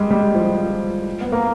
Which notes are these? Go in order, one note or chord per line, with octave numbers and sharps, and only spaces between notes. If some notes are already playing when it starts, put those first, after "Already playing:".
Already playing: G3 G#3
G3
F3
B3
A#3